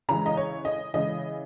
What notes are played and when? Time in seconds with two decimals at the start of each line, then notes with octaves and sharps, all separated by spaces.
0.09 C#3 E3 G#3 A#5
0.26 D#5
0.37 C#5
0.65 D#5
0.93 C#3 E3 G#3 D#5